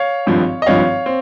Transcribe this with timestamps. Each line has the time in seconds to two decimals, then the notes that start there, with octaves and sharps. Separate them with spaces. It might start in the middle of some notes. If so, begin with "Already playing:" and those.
Already playing: C#5 F5
0.27 G#1 G2 F3
0.62 D#5
0.66 G#1 G2 F3 C#5 F5
1.06 C4